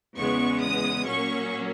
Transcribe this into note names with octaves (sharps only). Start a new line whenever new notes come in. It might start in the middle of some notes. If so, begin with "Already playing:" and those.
E2 C#3 G#3 B3 C#6
D#6
A#2 F#3 A#3 C#4 C#6